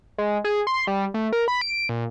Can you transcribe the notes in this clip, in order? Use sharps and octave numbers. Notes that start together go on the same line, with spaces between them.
G#3
G#4
C6
G3
A3
A#4
B5
D7
A#2